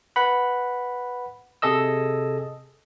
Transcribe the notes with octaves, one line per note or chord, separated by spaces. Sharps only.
B4 F#5 B5
C3 G#4 A4 D#5 E6